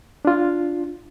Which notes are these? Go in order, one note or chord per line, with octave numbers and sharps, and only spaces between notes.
D4 F4